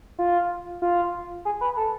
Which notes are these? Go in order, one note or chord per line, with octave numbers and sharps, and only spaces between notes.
F4
F4
G#4
B4
A4